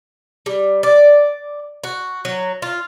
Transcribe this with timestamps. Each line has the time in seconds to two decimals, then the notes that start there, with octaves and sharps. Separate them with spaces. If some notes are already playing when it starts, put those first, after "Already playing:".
0.46 G3
0.83 D5
1.84 F#4
2.25 F#3
2.62 F4